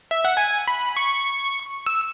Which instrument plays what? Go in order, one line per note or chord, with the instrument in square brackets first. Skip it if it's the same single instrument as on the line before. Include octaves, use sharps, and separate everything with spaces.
[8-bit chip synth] E5
F#5
G#5
B5
C#6
E6